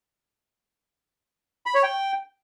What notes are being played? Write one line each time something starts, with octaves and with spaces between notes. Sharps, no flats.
B5
C#5
G5